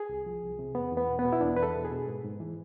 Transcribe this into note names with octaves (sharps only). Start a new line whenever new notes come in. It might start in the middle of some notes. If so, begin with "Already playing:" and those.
Already playing: G#4
C2
F3
C2
C3
E2 B3
E2 B3
B2
B3
B2
E4
E2 D4
E2 B4
A4
B2
G#4
B2
G#2
G#2
E3